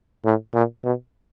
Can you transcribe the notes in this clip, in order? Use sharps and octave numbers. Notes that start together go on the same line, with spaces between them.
A2
A#2
B2